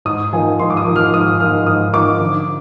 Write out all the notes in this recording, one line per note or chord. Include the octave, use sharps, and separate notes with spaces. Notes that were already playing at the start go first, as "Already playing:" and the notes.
G#2 D#6
F3 A#3 D#4 G#5
G#2 C6
D6
D#6
F3 A#3 D#4
F6
G#2 D#6
F3 A#3 D#4 F6
G#2 D#6
F3 A#3 D#4 D6
D3